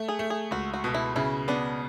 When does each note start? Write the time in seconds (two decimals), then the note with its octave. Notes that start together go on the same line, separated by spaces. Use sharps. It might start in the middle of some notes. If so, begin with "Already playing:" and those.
Already playing: A3
0.08 G#4
0.19 A3
0.30 G#4
0.51 C#2 F#4
0.74 F#4
0.84 B2
0.94 E4
1.16 C#3 E4
1.48 B3 D4